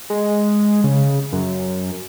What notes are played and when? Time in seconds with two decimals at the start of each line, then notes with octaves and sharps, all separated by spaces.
0.10 G#3
0.84 C#3
1.32 F#2